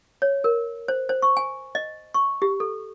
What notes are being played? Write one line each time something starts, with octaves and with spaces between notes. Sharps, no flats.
C#5
A#4
C5
C5
C#6
G#5
D#5
C#6
G4
A4